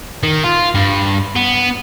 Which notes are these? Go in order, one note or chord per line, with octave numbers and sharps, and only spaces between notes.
D#3
F4
G2
B3